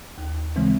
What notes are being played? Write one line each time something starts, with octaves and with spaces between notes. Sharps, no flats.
D#2
C#3 E3 G#3 C4